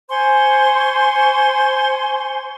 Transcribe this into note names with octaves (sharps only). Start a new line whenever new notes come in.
C5 G#5 C6 C#6